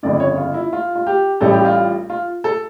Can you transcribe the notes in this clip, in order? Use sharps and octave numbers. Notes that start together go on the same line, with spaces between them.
G1 F2 C#3 D5
C#5
F4
E4
F4
F4
G4
A1 A2 G3 C#4 A4
G4
F4
F4
A4